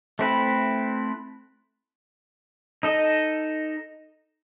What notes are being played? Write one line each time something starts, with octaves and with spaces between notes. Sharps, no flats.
A3 C4 E4 B4
D#4 A4 D#5